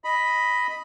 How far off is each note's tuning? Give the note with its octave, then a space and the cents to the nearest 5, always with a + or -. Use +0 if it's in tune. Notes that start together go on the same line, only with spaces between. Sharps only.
D#5 +5 B5 +0